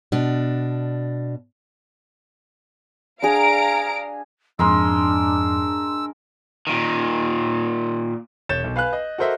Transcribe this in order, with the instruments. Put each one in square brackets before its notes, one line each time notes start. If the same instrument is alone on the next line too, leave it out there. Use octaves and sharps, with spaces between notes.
[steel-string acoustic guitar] B2 D4
[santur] D4 G#4 [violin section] F5 A#5 D7
[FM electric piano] F2 G#2 [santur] G#3 A#4 C6 [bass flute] D4 [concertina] E6
[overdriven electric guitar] A#2 D#3
[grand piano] E1 C#5 G6 A6 E7
B1
B4 F5 G#5 F#6
D#5
F#4 A4 A#4 C5 D#5 E5